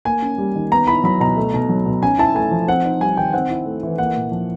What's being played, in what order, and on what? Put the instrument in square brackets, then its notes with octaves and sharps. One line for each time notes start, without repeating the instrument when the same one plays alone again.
[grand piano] A#3 G#5
C#4
G3
D#3
B3 A#5
E4 B5
F#3 B5
B2 A#5
A3
B2
F#3
B2
C#4 G#5
E4 A5
A3 G#5
F3
C4 F#5
D#4
G3 G#5
D#3 G5
C4 F#5
E4
A3
E3
A#3 F#5
A#2
F3